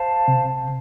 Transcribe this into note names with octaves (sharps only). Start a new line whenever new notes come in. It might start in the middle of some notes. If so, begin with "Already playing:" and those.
Already playing: C5 F5 A5
C3